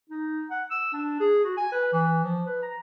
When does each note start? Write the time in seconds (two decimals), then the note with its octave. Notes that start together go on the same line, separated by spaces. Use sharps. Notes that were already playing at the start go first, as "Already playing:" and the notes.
0.09 D#4
0.50 F#5
0.71 E6
0.93 D4
1.20 G#4
1.44 F#4
1.57 G#5
1.72 B4
1.93 E3
2.24 F3
2.46 B4
2.62 A#5